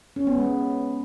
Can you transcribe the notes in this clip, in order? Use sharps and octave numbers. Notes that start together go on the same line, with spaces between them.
C#4
B3
G#3